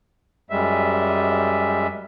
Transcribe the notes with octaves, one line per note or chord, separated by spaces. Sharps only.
F#2 G3 G#3 E5